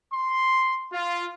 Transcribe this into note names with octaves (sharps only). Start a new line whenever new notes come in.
C6
F4